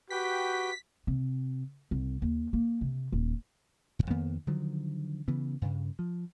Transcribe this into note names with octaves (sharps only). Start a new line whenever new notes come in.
F#4 G4 B4 G5 B6
C3
C2
D#2
A#3
C3
D#1
D#1 A#2
F2 D#3 A#3 B3
D3 D#3 F3 F#3
C#3 E3 B3
G2 C#3
F3